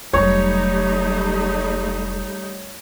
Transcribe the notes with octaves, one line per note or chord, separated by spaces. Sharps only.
F1 F#3 G3 A3 D#4 C#5